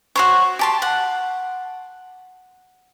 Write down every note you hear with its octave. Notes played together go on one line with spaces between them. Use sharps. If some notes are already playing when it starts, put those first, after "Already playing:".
F#4 C5 C#5
G4 A5 C6
F#5